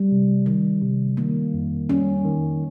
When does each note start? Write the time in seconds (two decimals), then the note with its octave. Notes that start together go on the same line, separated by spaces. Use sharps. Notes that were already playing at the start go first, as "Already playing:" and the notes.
Already playing: G3
0.12 C3
0.46 D#3 G3
0.82 C3
1.17 D#3 A#3
1.54 F2
1.89 G3 C#4
2.25 D#3